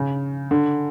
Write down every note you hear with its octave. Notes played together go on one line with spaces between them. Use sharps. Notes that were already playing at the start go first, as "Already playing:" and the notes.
Already playing: C#3
D3